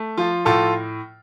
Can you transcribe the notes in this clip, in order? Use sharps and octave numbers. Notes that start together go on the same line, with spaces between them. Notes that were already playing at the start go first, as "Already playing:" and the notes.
Already playing: A3
F3 F4
A2 F4 A4